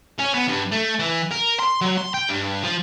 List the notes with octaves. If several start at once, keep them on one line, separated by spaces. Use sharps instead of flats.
C#4
B3
G2
A3
E3
A#4
C6
F#3
C6
G5
G2
F3